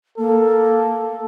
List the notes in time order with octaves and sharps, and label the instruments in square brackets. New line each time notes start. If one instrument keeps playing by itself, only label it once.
[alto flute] A#3 [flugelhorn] A4